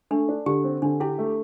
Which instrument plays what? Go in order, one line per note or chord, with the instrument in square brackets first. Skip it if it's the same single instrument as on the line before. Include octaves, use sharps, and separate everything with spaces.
[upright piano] A3 [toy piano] D4
[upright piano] D4
[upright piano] D3 [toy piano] G4
[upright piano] C4
[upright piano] D3 [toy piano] D4
[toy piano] E4 [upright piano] G4
[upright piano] A3